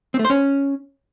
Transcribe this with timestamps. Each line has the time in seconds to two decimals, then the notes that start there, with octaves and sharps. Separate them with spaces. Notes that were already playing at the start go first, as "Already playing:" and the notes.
0.14 C4
0.19 A3
0.25 C5
0.30 C#4